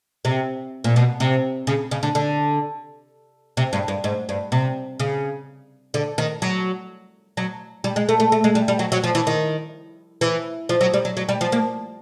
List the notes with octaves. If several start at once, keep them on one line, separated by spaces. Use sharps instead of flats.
C3
A#2
B2
C3
C#3
C#3
D3
D3
C3
G2
G2
G#2
G2
C3
C#3
D3
D#3
F#3
F#3
G3
G#3
A3
A3
A3
G#3
G3
G3
F#3
F#3
F3
E3
D#3
E3
F3
F#3
G3
F#3
F#3
G3
F3
A#3